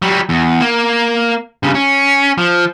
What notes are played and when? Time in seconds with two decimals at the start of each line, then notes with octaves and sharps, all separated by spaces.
0.02 F#3 G3
0.29 E2
0.61 A#3
1.63 G2 C#3
1.75 C#4
2.38 F3